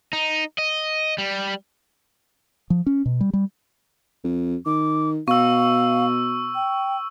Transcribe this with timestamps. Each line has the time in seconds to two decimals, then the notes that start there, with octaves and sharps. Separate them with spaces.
0.13 D#4
0.58 D#5
1.18 G3
2.70 F3
2.86 C#4
3.06 B2
3.21 G3
3.33 G3
4.24 F2
4.66 D#3 D6
5.28 B2 F5 C#6 E6
6.55 G5